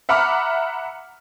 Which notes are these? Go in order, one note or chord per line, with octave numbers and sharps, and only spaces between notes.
E5 F#5 A#5 B5 D6 F6